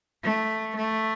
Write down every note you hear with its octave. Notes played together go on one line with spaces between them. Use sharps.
A3
A3